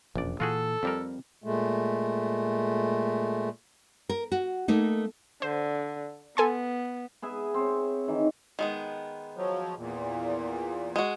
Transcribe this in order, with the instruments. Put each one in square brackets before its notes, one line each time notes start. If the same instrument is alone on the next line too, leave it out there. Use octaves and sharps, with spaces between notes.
[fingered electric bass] E1 F2 C#4 [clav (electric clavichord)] A#1 D5
[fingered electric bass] A#2 E3 A#3 [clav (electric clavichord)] F4 F#4 G#4 [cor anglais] A4
[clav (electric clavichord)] F2 G3 A#4 [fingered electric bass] C4
[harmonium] A#2 G#3 A3
[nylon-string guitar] A#4
F#4
A3 A#3 D#4
[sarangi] D3 [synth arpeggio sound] C5
[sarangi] B3 [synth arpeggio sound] A4 G#5 C6
[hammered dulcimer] B3 G#4 E5
C4 C#5
D#3 E3
[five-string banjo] D#3 G#3 B3
[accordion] F3 F#3
E2 A#2
[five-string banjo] G#3 F#4